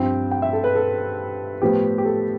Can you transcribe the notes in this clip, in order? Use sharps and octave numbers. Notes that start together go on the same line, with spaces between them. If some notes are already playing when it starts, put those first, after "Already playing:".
Already playing: G2 F3 C4 G5
G5
E5
A4
B4
A4
A2 F3 B3 G4
G4
A4